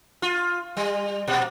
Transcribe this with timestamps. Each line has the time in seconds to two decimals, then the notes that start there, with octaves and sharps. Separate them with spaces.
0.22 F4
0.77 G3
1.28 A#2